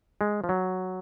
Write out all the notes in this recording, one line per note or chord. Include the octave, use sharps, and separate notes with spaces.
G#3
F3
F#3